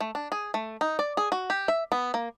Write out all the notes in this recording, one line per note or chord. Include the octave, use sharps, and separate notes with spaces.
A3
D4
G#4
A3
D#4
D5
G#4
F#4
G4
E5
B3
A#3